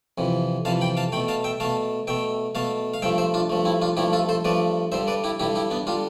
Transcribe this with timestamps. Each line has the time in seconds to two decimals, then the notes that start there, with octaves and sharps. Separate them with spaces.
0.18 F2 C3 E3
0.65 F2 C3 E3 F5 A5
0.81 G5 B5
0.97 F5 A5
1.12 B2 A3 G5 B5
1.28 F5 A5
1.44 E5 G5
1.60 B2 A3 F5 A5
2.07 B2 A3 E5 G5
2.55 B2 A3 F5 A5
2.94 F5
3.02 G2 F3 A3 E5 G5
3.18 C5 E5
3.34 D4 F4
3.50 G2 F3 A3
3.65 C4 E4
3.82 D4 F4
3.97 G2 F3 A3 E4 G4
4.13 F4 A4
4.29 A4 C5
4.45 G2 F3 A3 B4 D5
4.92 G2 D3 G3 C5 E5
5.08 B4 D5
5.24 E4 G4
5.39 G2 D3 G3 E4 G4
5.55 E4 G4
5.71 B3 D4
5.87 D3 G3 D4 F4